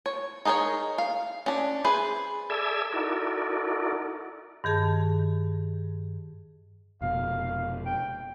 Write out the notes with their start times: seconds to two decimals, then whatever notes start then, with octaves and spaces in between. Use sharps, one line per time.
0.06 C#5
0.45 D#4 G#4 A#4 B4 C#5
0.98 F5
1.46 C#4 D4
1.84 G#4 B4 C5 E5
2.50 G#4 A4 D5 E5 E6 G#6
2.93 D#4 E4 F#4 A4 A#4 D5
4.64 G2 D#3 G#4 A5
7.02 F1 B2 F5
7.86 G5